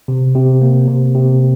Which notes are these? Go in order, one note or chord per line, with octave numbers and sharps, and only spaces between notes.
C3
C3
A#3
C3
C3